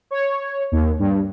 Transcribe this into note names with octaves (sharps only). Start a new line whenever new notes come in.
C#5
D#2
G2